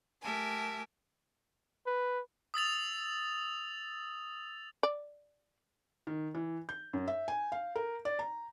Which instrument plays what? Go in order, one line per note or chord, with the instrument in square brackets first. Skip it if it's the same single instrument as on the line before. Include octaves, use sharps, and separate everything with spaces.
[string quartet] A3 G4 A#4 E5 G#5 A5
[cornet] B4
[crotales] D#6 E6 A6 F7
[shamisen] D5
[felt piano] D#3
E3
G6
F#2
E5
G#5
F5
A#4
D5
A#5